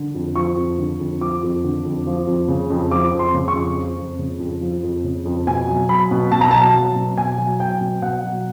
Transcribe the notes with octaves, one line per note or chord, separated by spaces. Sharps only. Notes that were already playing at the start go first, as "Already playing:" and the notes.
Already playing: D3
F2
F3 C#6
F2
D3
F2
F3 D6
F2
D3
F2
F3
F2
C#3
F2
F3 D6
F2
C6
C#3
C#6
F2
F3
F2
C#3
F2
F3
F2
C#3
F2
B2 G#5
F#3
F#3 B5
B2
B2 A5
A#5
F#3 A5
F#3
B2
B2 G#5
F#3
F#3 G5
B2
B2 F#5
F#3